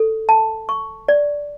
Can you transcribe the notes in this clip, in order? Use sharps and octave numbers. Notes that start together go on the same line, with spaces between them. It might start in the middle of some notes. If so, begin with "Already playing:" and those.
Already playing: A4
A5
C#6
D5